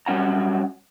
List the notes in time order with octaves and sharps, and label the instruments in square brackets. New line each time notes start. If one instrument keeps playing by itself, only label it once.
[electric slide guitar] F#3 G3 C#4 F#5 A#5